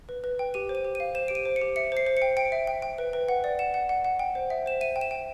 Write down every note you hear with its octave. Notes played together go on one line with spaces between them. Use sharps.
B4
B4
G5
G4 D#7
C5
D#7
G4
F5 D#7
C5 E7
G4 D7
D#7
C5
C#7
G4
E5 C#7
C5 C7
C5
C#7
G5
G5 D7
E5
G5
G5
B4
B4
F#5
D5
F#5 E7
F#5
F#5
F#5
G5
C5
E5
C5 E7
E5 D#7
G5
E7
G5